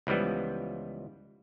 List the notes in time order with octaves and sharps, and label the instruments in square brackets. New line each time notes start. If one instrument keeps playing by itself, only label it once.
[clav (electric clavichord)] C#2 E3 F3 G3 B3